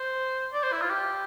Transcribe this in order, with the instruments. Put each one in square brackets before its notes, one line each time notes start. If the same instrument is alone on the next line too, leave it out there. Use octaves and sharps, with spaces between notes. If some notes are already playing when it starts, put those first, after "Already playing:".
Already playing: [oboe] C5
D5
C5
E4
F4
G4